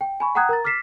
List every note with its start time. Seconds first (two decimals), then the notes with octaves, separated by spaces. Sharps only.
0.01 G5
0.20 G#5 B5 C#6
0.35 F#5 G5 A#5 D#6 F#6 G#6
0.49 A#4 A#5 A6
0.64 D6 F6 A6 B6 C7 E7